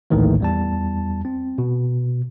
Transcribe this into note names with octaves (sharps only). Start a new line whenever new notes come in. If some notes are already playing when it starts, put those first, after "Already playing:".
A#1 D#2 A2 D#3 E3 A3
E2 G3 A5
C4
B2